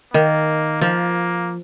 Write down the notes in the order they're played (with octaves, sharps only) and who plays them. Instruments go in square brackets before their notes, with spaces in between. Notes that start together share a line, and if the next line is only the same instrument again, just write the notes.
[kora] D#3 [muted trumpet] A#3
[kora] F3 [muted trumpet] A#3